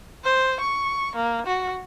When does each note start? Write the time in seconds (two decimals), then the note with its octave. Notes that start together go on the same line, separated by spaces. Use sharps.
0.24 C5
0.60 C#6
1.16 A#3
1.47 F#4